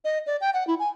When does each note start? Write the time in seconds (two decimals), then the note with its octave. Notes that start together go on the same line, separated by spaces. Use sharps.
0.04 D#5
0.27 D5
0.41 G5
0.54 F#5
0.67 E4
0.79 G#5